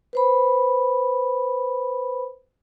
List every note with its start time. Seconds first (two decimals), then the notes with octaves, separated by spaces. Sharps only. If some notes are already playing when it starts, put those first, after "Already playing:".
0.13 B4 C5 B5